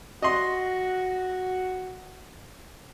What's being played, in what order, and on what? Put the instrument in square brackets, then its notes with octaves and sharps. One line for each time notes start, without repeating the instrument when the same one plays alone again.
[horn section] F#4 [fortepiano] D#5 C6